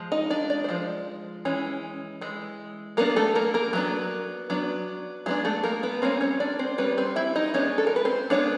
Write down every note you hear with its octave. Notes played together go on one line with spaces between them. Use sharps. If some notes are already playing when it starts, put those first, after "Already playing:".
Already playing: F3 G#3
D#4 D#5
D4 D5
D4 D5
C5
F3 G#3
E3 G#3 C#4
E3 G#3
F#3 A#3 B3 D4 A#4
A3 A4
A#3 A#4
A#3 A#4
F#3 B3 D4
F#3 B3 D4
F#3 G#3 B3 D4 G#4
A3 A4
A#3 A#4
B3 B4
G3 A#3 C4 C#4 C5
C#4 C#5
D4 D5
C4 C5
G3 A#3 B3 C#4 B4
C4 C5
E4 E5
D#4 D#5
G#3 B3 C#4 D4 C#5
A4
A#4
B4
C4 C5
G#3 B3 C#4 D4 C#5